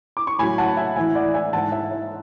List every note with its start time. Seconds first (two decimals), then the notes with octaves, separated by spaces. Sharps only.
0.17 D6
0.27 C#6
0.39 A2 F#3 G#5 B5
0.58 F#5 A5
0.77 E5 G#5
0.96 A2 E3 E5 G#5
1.15 D5 F#5
1.34 E5 G#5
1.53 G#2 E3 F#5 A5
1.72 E5
1.91 E5